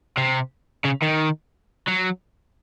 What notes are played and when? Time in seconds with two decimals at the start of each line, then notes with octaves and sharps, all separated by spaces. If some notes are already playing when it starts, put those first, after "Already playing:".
0.18 C3
0.85 C#3
1.02 D#3
1.88 F#3